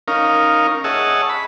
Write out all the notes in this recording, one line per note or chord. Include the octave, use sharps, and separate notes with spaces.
C#4 D#4 A#4 F5
G#4 C#5 D#5 E5 F#5 A5
B5